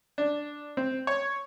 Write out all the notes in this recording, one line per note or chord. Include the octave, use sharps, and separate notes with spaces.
D4
C4
C#5